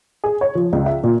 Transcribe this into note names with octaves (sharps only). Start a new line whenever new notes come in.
G#4
C#5
F3
C#2
E5
A#2